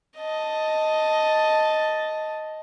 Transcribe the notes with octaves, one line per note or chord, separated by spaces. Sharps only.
D#5 A5